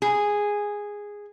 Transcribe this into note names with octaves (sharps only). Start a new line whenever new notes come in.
G#4